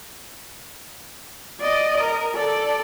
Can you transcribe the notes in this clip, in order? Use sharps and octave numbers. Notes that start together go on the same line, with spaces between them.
D5 D#5
A#4
A4 D5